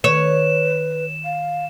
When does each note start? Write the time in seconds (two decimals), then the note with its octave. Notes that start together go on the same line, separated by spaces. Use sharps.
0.04 D#3 B4 C#5 E7
1.25 F5